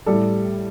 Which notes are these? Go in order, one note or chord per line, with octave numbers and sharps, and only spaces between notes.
A2 G3 A4